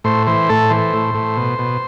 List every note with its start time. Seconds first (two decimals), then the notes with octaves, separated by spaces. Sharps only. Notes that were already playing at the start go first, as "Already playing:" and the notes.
0.04 A2 C5
0.27 E3 C5
0.49 A2 A4
0.70 E3 C5
0.93 A2
1.15 A2
1.37 B2
1.59 B2